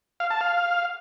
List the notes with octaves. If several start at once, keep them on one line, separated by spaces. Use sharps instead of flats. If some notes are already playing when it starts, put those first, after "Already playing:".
F5
A5
F5